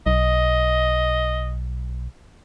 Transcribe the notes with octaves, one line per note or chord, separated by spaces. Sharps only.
B1 D#5